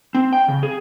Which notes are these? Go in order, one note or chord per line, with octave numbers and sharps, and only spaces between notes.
C4
G5
C#3
G#4